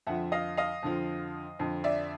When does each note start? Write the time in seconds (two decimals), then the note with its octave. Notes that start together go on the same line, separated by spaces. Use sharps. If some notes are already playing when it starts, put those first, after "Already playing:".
0.07 F2 D3 F3 E5 F#5
0.32 D#5 F5
0.57 D#5 F5
0.83 F2 D3 F3
1.59 F2 D3 F3
1.84 D5 E5